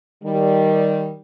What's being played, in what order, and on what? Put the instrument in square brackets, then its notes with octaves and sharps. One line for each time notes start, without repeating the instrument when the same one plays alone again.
[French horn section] D#3 G3